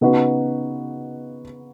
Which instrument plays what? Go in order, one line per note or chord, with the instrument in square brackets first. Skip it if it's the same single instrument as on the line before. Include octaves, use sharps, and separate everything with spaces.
[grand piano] C#3 B3 D#4 F#4 B4